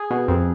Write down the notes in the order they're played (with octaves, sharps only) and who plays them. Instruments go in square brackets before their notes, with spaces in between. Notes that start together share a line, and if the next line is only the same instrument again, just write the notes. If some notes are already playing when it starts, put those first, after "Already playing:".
Already playing: [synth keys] G#4
B2
F2